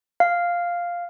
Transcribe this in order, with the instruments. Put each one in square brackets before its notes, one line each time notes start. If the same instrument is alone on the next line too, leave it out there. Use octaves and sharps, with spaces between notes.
[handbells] F5